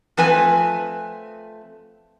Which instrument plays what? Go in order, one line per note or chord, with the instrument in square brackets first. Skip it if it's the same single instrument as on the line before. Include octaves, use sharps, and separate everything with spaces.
[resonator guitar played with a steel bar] F3 A3 C4 B4 G#5